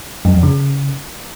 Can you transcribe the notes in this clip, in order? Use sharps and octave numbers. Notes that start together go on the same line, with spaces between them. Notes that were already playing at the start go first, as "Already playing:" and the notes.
F#2
F2
C#3